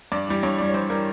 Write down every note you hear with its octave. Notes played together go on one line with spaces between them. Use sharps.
G2 D5
E3 G3
G2 C#5
E3 G3 D5
C#5
G2 C5
E3 G3 A#4